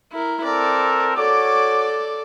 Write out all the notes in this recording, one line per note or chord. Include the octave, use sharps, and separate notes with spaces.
E4 A#4
C4 A4 A#4 D5
F#4 A4 C#5 D5 D6